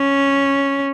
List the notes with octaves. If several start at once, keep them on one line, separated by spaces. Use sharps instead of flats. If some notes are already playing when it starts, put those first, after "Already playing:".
Already playing: C#4